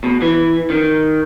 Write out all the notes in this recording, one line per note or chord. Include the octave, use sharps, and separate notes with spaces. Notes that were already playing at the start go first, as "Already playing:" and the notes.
B2
E3
D#3